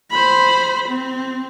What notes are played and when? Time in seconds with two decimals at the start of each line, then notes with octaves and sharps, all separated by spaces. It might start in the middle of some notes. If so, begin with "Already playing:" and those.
0.11 C5 B5
0.88 C4